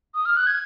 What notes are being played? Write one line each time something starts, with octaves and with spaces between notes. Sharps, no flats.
D#6
F6
F#6
G#6